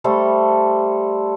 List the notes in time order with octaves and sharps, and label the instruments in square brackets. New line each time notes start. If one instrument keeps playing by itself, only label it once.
[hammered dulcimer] G3 A3 A4 C5